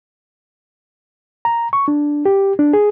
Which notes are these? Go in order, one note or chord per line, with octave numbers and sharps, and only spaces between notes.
A#5
C#6
D4
G4
D4
G#4